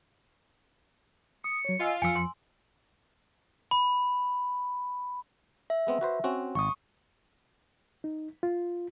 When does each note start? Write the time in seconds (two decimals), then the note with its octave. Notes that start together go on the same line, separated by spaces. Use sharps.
1.44 D#6 C#7
1.65 F#3 C#5
1.80 F4 D#5 G#5 E6
2.02 F2 F3 G#5 E6 C#7
2.16 C6
3.71 B5
5.70 E5
5.87 G#3 B3 C4
6.01 F#4 B4 C5
6.24 C4 C#4 F#4
6.55 G#1 C#6 D#6
8.04 D#4
8.43 F4